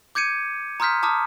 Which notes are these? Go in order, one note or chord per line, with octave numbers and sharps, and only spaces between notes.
D6 G6 G#6 C#7 D#7
A#5 C6 D#6 F6 G6 B6
A5 A#5 D6 D#6 F6